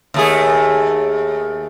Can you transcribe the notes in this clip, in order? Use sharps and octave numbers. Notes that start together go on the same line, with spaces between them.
D#2 A3 G#4